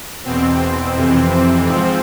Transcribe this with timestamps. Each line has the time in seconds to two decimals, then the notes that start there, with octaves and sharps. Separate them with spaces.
0.24 E2 B2 C4
0.94 F2 C3 E3
1.66 G#2 F3 C4